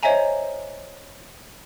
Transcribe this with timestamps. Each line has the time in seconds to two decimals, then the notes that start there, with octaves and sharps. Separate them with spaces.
0.03 C5 C#5 D#5 E5 G#5 A#5